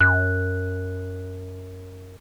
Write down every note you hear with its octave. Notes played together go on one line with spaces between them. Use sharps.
F#2 F#6